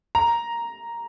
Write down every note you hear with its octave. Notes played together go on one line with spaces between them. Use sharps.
A#5